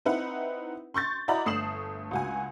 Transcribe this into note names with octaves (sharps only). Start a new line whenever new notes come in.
C4 D#4 E4 B4 F#5
C6 C#6 G6 A6
E4 F#4 D5 D#5 A#5 B5
G1 A3 D#6 C7 E7 F#7
C#2 F#4 G#5